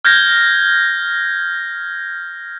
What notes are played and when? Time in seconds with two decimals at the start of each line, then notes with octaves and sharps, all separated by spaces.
0.05 F6 G6 G#6 A#6